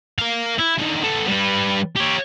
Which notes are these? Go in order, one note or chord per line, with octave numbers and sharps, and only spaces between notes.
A#4 F5
E4
D3 D#3
B3 A4
G3 B4
G4 C#5